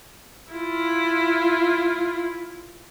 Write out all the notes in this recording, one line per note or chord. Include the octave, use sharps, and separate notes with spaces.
E4 F4